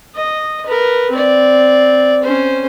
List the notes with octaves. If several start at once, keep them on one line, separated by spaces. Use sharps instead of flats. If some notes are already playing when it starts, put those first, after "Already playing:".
D#5
A#4 B4
C4 D5
C#4 C5